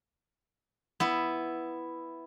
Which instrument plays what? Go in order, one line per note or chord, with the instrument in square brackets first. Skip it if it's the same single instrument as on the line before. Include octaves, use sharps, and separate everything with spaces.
[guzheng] B3 E4